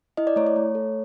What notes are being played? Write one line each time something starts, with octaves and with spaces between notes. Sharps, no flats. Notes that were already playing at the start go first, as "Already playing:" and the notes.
E4 D#5
D5
A3 C#5
C#5
A3
A4